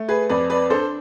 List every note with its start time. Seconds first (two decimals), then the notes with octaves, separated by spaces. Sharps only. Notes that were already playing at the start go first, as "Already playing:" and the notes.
Already playing: A3
0.08 G#4 B4
0.29 F2 B4 D5
0.50 B4 D5
0.70 D4 A4 C5